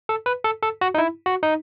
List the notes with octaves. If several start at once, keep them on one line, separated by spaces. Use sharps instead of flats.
A4
B4
A4
A4
F#4
D#4
E4
F#4
D#4